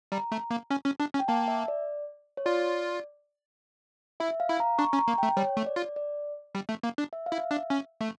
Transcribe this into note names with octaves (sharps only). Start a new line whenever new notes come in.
G3 A#5
A3
A#3
C#4
C#4
D4
C#4
G5
A#3 A5
E5
D5
C#5
F4 D5
E4 E5
F5
E4
A#5
D4 C#6
C#4
A#5
A#3
G5
A3
G3 C#5
A3
D5
F4
D5
G3
A3
A#3
D4
E5
F5
E4
E5
D4
C#4
A3